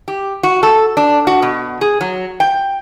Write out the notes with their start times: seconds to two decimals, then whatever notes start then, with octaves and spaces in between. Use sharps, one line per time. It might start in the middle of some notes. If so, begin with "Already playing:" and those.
0.08 G4
0.43 F#4
0.63 A4
0.97 D4
1.27 F#4
1.42 B2
1.81 G#4
2.01 F#3
2.40 G5